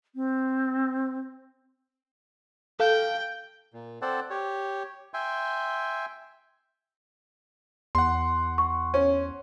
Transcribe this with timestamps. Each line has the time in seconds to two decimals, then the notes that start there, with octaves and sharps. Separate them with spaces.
0.15 C4
2.80 A4 F5 G5
3.74 A#2
4.02 C4 A4 C5 D5 F#5 A5
4.30 G4 C#5
5.14 E5 G5 G#5 C6
7.95 E2 F#5 C6
8.58 C#6
8.94 C#4